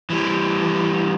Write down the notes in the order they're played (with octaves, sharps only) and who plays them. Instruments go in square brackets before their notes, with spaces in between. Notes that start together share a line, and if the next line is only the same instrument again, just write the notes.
[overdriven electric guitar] E3 G3